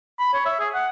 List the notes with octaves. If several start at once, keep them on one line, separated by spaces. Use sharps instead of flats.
B5
C#5
E5
G#4
F#5